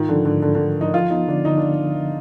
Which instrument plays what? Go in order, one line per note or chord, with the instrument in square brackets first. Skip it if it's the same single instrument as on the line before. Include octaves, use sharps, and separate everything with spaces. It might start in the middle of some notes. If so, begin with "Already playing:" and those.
Already playing: [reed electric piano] G#2 F4 [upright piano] D#3
[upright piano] D3 [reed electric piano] F3
[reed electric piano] G#2 [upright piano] D3
[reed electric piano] G#2 [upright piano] D3
[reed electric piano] G#2 [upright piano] D3
[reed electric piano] F3 [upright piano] D#4
[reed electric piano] F3 [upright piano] F4
[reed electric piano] B3 [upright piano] D#4
[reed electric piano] D3 [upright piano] D4
[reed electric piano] D3 [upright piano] D#4
[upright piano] D4